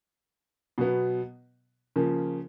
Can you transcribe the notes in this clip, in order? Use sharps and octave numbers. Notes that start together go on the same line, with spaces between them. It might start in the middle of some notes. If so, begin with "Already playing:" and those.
B2 F#3 B3
C#3 F3 A#3